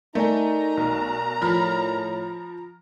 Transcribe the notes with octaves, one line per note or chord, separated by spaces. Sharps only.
A3 D#4 A#4 D5 G#5 A#5
B1
A2 F3 B5 F6